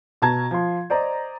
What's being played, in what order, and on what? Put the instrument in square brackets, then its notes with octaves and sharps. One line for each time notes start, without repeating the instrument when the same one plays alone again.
[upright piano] B2 F#4 A5 A#5 G#6
F3 C6
C5 D5 D#5 A#5